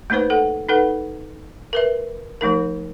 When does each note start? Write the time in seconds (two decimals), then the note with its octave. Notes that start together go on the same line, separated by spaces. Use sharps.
0.10 A3 A#3 D#4 B4 C5
0.30 A4 F#5
0.69 D#4 A4 B4 F#5
1.73 A#4 B4 E5
2.41 F3 A3 D#4 A#4